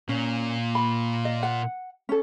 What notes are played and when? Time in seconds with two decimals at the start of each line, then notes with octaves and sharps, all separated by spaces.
0.09 A#2 C#4
0.75 B5
1.25 D#5
1.43 F#5
2.09 C#4 A4